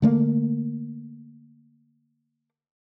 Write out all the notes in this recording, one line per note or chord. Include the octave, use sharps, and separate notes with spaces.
D3 A3 A#3